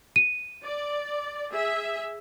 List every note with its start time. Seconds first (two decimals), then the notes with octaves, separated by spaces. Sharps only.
0.16 D#7
0.65 D5
1.51 G#4 E5